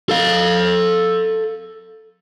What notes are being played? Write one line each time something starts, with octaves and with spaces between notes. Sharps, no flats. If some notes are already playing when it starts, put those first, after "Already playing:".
A4 F5